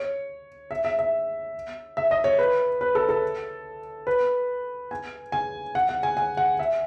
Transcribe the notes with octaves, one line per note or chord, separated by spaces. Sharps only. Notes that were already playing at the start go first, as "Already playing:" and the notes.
Already playing: C#5
E5
E5
E5
E5
D#5
C#5
B4
B4
A4
A4
B4
G#5
G#5
F#5
F#5
G#5
G#5
F#5
E5